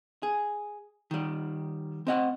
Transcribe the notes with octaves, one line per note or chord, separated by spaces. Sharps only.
G#4
D#3 G3
C4 D#5 F#5